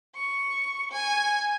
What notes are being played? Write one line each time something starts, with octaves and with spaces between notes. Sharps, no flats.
C#6
G#5